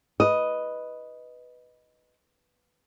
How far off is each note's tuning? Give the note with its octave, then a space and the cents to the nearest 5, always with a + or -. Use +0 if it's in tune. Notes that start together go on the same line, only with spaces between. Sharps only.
B4 +0 D#5 +0